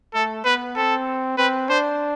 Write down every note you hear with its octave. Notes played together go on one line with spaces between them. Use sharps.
A3 A4
B3 B4
C4 A4
C4 B4
D4 C5